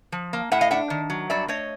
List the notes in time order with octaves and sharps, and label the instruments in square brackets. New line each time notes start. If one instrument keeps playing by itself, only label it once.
[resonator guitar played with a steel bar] F3
A#3
A2 E5 F#5
D#5 F5
D4 E5 F#5
D#3
F#3
G2 D5 E5
A3 C#5 D#5